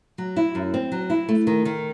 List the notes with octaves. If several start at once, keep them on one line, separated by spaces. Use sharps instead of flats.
F#3
E4
F#2
C4
F#3
E4
A3
D#3
D#3